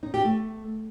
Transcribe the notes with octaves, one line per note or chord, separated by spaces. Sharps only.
D#4
G4
A3